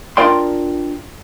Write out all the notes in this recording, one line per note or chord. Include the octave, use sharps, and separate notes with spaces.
D4 F4 A#4 D5 G5 C6